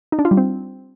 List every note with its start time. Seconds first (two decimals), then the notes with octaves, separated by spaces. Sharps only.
0.12 D#4
0.19 D4
0.25 F4
0.31 G3
0.37 C4